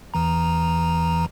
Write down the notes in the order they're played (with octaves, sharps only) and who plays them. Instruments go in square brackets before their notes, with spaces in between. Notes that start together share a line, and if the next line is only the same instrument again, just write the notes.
[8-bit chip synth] E2 E3 A#5